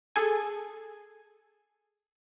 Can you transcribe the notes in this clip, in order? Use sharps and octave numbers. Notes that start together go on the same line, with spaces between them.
G#4 A4 G#5